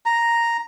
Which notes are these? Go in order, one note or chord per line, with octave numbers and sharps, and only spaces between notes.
A#5